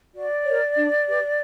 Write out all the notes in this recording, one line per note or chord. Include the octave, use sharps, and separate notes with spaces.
F#4 D5
A#4 C#5
D4
G4 B4